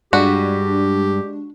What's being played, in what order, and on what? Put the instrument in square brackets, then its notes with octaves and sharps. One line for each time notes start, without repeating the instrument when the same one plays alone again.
[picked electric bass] G2 [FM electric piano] G#3 D4 [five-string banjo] F#4 [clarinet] G4